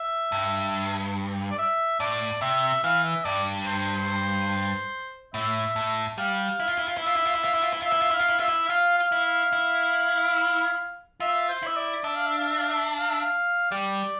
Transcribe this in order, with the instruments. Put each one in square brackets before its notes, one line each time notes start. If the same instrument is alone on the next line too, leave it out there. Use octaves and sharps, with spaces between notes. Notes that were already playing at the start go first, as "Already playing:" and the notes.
Already playing: [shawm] E5
[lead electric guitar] G2
[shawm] D5
E5
[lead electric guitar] A2 [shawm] D5
[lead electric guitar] C3 [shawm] E5
[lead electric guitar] E3 [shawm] F5
[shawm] E5
[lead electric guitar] G2 [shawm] D5
[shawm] C5
[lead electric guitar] A2 [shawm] E5
[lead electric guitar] A2
[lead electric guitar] G3 [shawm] F5
[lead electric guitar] E4
F4
E4
F4
E4
[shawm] E5
[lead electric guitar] F4
E4
F4
E4
F4
E4
F4
E4
[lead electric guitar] F4 [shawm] E5
[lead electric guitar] E4
F4
[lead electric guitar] E4 [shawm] F5
[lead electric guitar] F4
E4
[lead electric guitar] F4 [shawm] E5
[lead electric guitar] E4
[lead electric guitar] F4 [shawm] F5
[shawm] F5
[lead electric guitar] E4
[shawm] F5
[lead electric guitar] E4
[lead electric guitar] F4 [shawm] E5
[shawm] C5
[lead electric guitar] E4 [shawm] E5
[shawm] D5
[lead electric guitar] D4 [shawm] E5
[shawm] F5
E5
F5
E5
F5
E5
F5
E5
F5
[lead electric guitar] G3 [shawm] D5